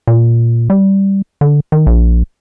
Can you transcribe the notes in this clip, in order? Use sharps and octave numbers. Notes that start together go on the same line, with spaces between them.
A#2
G3
D3
D#3
A#1